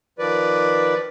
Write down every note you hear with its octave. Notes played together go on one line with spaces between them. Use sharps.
D#3 F3 B4 D5